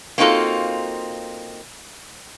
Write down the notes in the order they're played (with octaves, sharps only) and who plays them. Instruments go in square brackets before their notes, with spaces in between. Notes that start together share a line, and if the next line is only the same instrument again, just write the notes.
[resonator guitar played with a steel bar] A#3 C4 D#4 F4 F#4 A4